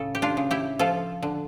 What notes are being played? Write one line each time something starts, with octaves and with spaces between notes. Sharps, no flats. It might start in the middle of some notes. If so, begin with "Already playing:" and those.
Already playing: A2 C#3 A4
G4
D4 F4
C#3
E4 G4
F3 F4 A4
D3